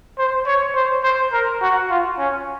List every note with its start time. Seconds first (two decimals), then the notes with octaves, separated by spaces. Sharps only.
0.18 C5
0.47 C#5
0.75 C5
1.04 C5
1.33 A#4
1.62 F#4
1.90 F4
2.19 C#4